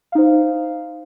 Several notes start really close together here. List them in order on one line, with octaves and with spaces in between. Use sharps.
F5 D#4 C5